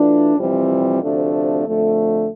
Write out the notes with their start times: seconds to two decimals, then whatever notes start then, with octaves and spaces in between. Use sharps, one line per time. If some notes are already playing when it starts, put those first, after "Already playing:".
Already playing: E3 A3 D4 F4
0.36 F2 C3 E3 G3 C4
1.00 D2 C3 F3 A3 D4
1.64 F2 D3 A3